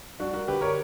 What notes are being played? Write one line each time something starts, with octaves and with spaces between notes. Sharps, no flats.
G3 D4 F#4
F#4 A#4
D3 G4 B4
A#4 C#5